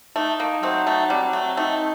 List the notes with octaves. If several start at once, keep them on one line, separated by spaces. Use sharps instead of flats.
A3 D#4
A#3
F#3 A3 C4
A3
G3 C4
A3
A3 D#4